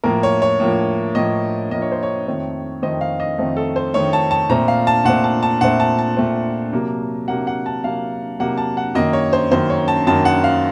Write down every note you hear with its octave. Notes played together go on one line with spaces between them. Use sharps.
A2 F3 A#3 A#4
C#5
C#5
A2 F3 A#3
A2 F3 A#3 D#5
A2 F3 A#3 D#5
C#5
C5
C#5
F2 D#3 A3 C4
F2 D#3 A3 C4 D#5
F5
D#5
F2 D#3 A3 C4
A4
C5
F2 D#3 A3 C4 C#5
A5
A5
A#2 A3 C4 A#5
F5
A5
A#2 A3 C4 F#5
A5
A5
A#2 A3 C4 F#5
A5
A5
A#2 A3 C4
C3 F#3 A#3
C3 F#3 A#3 F#5
F#5
A5
C3 F#3 A#3 F5
C3 F#3 A#3 F#5
A5
F#5
F#2 D#3 A#3 D#5
C#5
C5
F#2 D#3 A#3 C5
C#5
A5
F#2 D#3 A#3 A5
F#5
F5